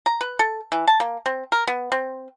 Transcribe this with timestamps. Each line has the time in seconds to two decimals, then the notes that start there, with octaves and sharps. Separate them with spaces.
0.06 A#5
0.21 B4
0.39 A4
0.72 E3
0.87 A5
1.00 A#3
1.26 C4
1.52 A#4
1.67 B3
1.92 C4